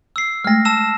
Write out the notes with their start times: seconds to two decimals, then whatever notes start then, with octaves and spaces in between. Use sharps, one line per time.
0.16 E6 C7
0.45 G#3 A3 F6 A#6
0.65 A5 E6 E7